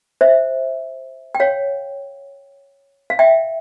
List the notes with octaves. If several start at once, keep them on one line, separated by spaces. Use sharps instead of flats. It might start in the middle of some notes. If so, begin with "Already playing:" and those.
C5 E5
G5
C#5 F5
F5
E5 G5